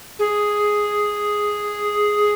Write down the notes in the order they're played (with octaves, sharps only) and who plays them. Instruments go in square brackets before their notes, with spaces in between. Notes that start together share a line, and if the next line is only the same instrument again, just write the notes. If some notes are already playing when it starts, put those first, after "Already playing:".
[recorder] G#4